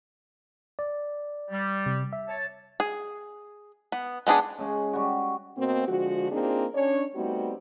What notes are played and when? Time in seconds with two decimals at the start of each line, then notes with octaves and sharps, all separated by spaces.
0.79 D5
1.51 G3
1.86 C3
2.13 E5
2.28 C#5 A5
2.80 G#4
3.92 B3
4.27 G#3 B3 D4 G#4
4.58 C#3 G#3
4.93 G3 F#4
5.57 B2 A#3 C4
5.87 D3 F3 G#3 F#4
6.31 A#3 C4 D4 D#4 F4 G#4
6.73 C#4 D4 C#5
7.15 G3 A3 B3 C4 D#4 F#4